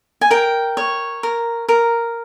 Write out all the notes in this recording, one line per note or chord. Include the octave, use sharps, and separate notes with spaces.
G#5
A#4 G5
C#5
A#4
A#4